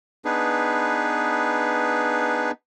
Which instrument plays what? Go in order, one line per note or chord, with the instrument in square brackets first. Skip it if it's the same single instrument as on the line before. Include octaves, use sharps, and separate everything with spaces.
[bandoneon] B3 D4 D#4 G#4 B4